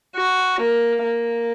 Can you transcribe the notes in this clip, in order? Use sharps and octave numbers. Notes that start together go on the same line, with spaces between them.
F#4
A#3
A#3